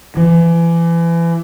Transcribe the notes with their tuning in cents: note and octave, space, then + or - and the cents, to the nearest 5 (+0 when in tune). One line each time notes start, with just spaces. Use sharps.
E3 +30